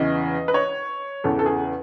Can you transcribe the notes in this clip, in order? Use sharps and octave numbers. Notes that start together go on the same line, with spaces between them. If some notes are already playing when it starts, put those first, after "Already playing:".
Already playing: E2 C#3 E3 D#5
B4
C#5
E2 C#3 E3 A4
A4
G#4